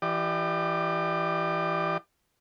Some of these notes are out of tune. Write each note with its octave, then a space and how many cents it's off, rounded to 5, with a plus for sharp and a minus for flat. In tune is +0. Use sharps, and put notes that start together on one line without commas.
E3 +20 G4 -10 D5 +40